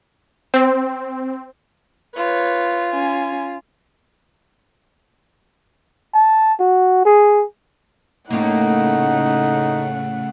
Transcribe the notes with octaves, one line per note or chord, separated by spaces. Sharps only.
C4
F4 B4 C#5
C#4 G#5
A5
F#4
G#4
A2 C#3 A3 A#3 D#4 F#5